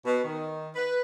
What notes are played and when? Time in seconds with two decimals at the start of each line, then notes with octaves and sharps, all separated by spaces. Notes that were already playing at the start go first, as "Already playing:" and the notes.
0.04 B2
0.23 D#3
0.75 B4